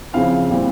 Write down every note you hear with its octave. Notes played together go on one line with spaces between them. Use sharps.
C#3 F3 C4 E4 F5
A#2 G3 C4 E4